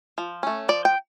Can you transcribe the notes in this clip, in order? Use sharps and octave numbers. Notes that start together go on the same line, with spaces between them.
F3
A3 C#4
F3 D5
G5